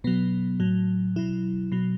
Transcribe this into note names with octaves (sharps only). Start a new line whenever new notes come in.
B2 F#3 B3
A2 F#3
B2 F#3 E4
B2 F#3